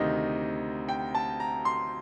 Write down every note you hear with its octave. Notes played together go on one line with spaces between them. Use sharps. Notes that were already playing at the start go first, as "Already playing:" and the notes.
Already playing: D2 C3 D#3 D#5
G5
A5
A#5
C6